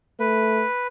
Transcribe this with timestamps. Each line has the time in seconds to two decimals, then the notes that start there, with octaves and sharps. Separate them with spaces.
0.20 A3 B4